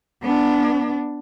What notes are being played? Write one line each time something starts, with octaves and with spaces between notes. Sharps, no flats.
B3 D4